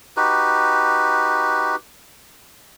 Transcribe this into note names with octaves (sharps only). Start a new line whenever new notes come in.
D#4 F#4 G4 B4